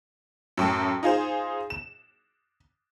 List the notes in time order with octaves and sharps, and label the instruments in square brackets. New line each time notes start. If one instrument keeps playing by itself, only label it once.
[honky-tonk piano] F#2 A2 G5 A5
D#4 F4 G#4 C5
E7